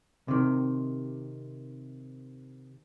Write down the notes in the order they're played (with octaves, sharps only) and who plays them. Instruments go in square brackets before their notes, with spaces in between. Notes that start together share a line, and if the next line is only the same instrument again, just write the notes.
[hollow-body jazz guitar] C3 D#3